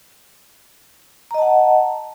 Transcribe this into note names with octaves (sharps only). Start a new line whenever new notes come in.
D#5 F#5 A5 A#5